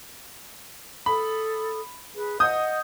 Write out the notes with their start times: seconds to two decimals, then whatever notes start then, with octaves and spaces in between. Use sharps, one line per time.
1.06 A4 B5 D#6
2.16 G#4 B4
2.40 D#5 F#5 D#6 G6